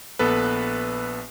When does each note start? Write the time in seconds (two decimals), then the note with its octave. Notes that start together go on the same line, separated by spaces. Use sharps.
0.19 A#1 B3 A4 B4